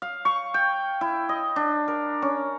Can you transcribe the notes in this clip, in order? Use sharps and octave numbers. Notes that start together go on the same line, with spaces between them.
F5
C#6
G5
E4
D#5
D4
A#4
C#4